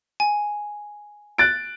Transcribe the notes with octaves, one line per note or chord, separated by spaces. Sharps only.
G#5
F#6 A6 D7